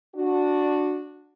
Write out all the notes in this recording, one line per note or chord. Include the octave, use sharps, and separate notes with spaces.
D4 F#4